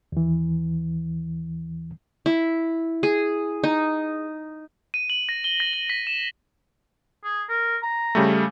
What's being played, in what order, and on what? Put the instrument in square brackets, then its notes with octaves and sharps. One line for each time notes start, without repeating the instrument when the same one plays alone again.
[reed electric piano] D#2 E3
[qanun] E4
G#4
D#4
[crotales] D#7
F#7
A#6
G7
A#6
F#7
B6
E7
[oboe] G#4
A#4
A#5
[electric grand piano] C#3 G3 A3